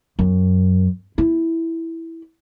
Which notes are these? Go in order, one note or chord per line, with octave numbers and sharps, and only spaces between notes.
F#2
E4